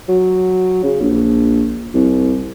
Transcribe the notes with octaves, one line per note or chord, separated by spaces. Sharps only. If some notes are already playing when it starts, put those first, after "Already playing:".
F#3
C#3
A#1
C2